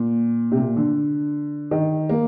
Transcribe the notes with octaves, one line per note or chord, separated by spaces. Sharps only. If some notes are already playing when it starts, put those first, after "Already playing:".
Already playing: A#2
C3
A#2
D3
D#3
A#3